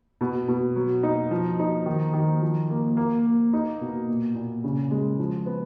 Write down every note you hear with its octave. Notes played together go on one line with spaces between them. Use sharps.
B2
B2
F#3
D#4
F3
D#4
D#3
D#3
F3
A#3
A#3
A#3
D#4
B2
A#2
A#2
C#3
G#3
F3
B3